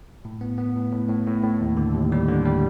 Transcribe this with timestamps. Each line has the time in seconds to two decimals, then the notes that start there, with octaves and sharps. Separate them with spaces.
0.25 A2
0.41 B3
0.58 B3
0.76 A2
0.92 A2
1.09 A2
1.27 A2
1.43 A2
1.61 D#2
1.77 D3
1.94 D#2
2.12 G3
2.28 D3
2.46 G3